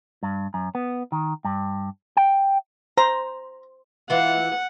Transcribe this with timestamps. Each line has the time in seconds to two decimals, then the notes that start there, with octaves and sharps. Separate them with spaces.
0.23 G2
0.54 F#2
0.75 B3
1.12 D#3
1.45 G2
2.17 G5
2.98 C5 A#5
4.10 E3 F4 F#5